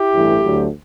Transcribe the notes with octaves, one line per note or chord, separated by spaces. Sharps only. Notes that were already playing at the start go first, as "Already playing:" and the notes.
Already playing: E4 G4
A1 G2 E3 A3
D2 D3 F#3 A3